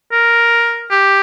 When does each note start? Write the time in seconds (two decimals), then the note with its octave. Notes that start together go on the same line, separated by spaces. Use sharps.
0.12 A#4
0.91 G4